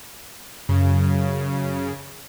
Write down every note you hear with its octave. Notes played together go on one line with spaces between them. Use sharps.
F#2 C#3